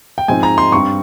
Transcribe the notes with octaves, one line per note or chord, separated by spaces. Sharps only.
G5
G#2 F3 C4 D#4 G#5
A#5
C6
G2 G3 C4 C#6